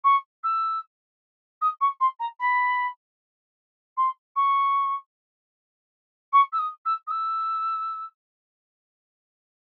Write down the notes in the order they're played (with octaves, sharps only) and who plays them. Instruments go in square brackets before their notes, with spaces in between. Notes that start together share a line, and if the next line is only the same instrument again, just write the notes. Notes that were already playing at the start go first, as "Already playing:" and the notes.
[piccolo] C#6
E6
D#6
C#6
C6
A#5
B5
C6
C#6
C#6
E6
D#6
E6
D#6
E6